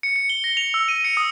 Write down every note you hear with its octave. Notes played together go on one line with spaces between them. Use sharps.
C#7
C#7
G7
A#6
F7
E6
D#7
C#7
D#6